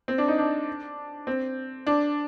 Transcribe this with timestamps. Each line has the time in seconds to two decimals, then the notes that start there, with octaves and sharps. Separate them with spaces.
0.08 C4
0.18 D4
0.28 D#4
0.38 D4
1.27 C4
1.87 D4